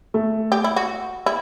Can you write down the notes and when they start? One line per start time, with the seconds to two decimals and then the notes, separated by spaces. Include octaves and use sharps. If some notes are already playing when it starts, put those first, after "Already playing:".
0.14 A3
0.52 G4
0.64 E4
0.76 F#4
1.26 E4